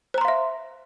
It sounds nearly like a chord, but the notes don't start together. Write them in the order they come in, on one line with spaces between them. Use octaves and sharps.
C5 A#5 C6 F5 E5